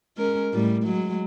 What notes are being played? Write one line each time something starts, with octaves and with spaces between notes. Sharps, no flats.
G#3 C#4 A#4
A2 G3
F#3 G#3